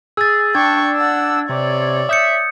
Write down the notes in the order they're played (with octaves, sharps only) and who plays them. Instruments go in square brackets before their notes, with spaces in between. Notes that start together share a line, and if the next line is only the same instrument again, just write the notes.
[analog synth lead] G#4 [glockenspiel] E6 A6
[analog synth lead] D4 [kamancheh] G5 C#6 [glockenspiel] G#6
[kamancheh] F#5 E6
[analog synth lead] C3 [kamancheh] C#5 D5
[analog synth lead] E5 [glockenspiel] D#6 G6 C#7